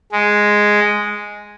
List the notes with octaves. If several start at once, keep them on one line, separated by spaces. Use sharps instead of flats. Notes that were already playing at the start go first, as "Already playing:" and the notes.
G#3